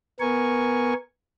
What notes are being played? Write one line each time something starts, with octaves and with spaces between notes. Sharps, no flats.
B3 A#4 G#5 C#6